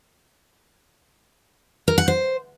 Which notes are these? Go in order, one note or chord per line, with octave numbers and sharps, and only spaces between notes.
A#4
F#5
C5